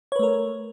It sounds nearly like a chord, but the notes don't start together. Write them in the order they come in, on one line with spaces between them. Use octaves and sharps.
C#5 B4 A3 A#4